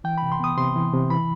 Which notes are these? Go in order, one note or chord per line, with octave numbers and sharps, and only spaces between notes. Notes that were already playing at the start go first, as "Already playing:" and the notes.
E3 G5
C3 B5
C6
B3 D#6
C3 C6
E3
C3
E3 B5